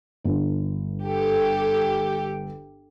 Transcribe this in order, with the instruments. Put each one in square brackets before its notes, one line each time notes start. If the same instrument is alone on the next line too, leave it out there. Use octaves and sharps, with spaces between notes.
[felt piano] G1
[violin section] G4 A4